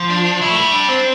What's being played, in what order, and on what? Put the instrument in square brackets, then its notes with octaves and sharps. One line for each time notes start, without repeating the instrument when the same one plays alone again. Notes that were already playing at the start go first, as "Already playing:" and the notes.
Already playing: [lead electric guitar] F3
[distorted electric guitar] D4
[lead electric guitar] G3 [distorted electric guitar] E4
[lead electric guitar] A3
G3
[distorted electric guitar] D4
[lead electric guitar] C4